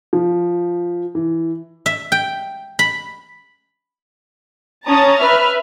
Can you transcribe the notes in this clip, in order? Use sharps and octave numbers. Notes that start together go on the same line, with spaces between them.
F3
E3
E5
G5
B5
C#4 A5 A#5 D#6 A6
B4 E5 F6